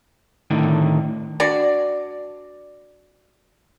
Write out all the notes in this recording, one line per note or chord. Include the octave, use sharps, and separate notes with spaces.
A2 D3 D#3
D4 F#4 D5